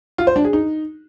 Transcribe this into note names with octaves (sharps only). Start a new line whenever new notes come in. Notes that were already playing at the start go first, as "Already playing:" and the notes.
F4
C5
D4
G#4
D#4